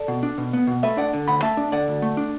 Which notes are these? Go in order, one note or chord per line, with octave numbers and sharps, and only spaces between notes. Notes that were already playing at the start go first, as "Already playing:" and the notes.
Already playing: A4 D5
B2
D4
B2
B3
B2
A3 B4 E5
D4 D5 F#5
D3
D2 F#5 B5
A3 E5 A5
D4
D3 D5 F#5
D2
A3
D4